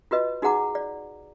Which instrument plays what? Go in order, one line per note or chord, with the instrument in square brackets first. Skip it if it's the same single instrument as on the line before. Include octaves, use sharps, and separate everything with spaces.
[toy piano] F4 F#4 B4 D#5
D#4 F#4 G#4 F#5 A#5 D6
D5